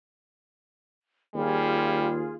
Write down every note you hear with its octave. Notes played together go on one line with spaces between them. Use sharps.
D#2 G3 F4 G#4